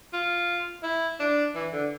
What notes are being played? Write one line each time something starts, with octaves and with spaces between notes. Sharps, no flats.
F4
E4
D4
E3
D3